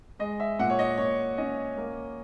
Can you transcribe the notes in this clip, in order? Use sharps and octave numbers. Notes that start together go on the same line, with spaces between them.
G#3 D#5
E5
A#2 F#5
C#5
D#5
A#2 C#5
C#4 D#5
A#3